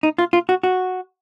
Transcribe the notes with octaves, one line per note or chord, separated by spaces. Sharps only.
D#4
F4
F4
F#4
F#4